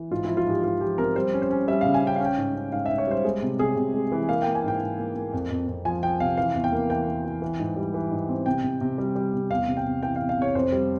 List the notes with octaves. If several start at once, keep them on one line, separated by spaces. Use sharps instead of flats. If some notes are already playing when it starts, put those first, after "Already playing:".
Already playing: E3
G#2 F4
F3 E4
F4
G#2 G4
G#2 F4
F3 G4
C4 A#4
G3 C5
C#4
C5
C#4
G3 E5
C#3 F5
G#5
C#4 G5
C#4 F5
G5
G#2
C#4
G#2 F5
G#2 E5
C#5
G3 C5
G#3
C3
C3 G#4
C3
G#3
E3
A#3 F5
A#3 G5
G#5
G#2 G5
G#2
A#3
A#3
F2
F2
F2
F3 G#5
F3 G5
C3 F5
E3 F5
E2
G5
A#3
E3 G5
A#3
E3
E3
G#2
G3
E3
G#2
C4
C3 G5
C3
C3
G3
G3
C3
E2 F5
C3
G5
C3
E3 G5
E2 F5
F5
C3 C#5
F2 C5
G3